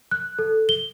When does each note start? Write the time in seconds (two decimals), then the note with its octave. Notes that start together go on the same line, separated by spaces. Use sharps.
0.11 F#6
0.39 A4
0.69 G7